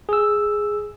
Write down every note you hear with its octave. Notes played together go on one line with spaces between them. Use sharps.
G#4 E6